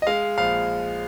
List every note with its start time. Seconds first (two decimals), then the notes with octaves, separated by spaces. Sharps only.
0.02 D#5
0.07 G#3 F5
0.38 A#1 F5